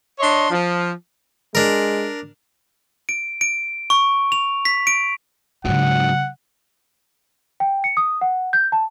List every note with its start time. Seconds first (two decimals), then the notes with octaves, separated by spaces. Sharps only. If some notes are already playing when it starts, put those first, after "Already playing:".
0.19 D4 C#5 D#5 C6
0.50 F3
1.55 G#3 D4 A#4
3.09 D7
3.41 D7
3.90 C#6
4.32 F7
4.65 B6
4.87 D7
5.65 G#2 C#3 F#3 D4 F#5
7.60 G5
7.84 C#7
7.97 D#6
8.21 F#5
8.53 G6
8.72 A5